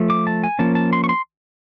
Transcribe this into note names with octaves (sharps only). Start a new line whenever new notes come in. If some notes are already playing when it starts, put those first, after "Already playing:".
Already playing: F3 A3
D6
A5
G#5
F3 A#3 C#4 A5
A5
C6
C#6
C6